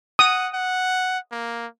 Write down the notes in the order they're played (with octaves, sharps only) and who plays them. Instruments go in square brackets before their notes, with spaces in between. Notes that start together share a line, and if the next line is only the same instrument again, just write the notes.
[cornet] F#5 [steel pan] D#6
[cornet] F#5
A#3